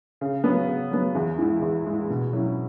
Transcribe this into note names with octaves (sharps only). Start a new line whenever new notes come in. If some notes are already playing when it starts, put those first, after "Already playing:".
C#3
F#3 B3
C#3
F#3 B3
E2
E3 G#3 E4
E2
E3 G#3 E4
B2
F#3 C#4 E4